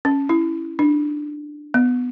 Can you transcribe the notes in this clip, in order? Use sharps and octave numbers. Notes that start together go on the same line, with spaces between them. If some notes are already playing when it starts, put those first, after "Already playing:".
C#4
E4
D4
B3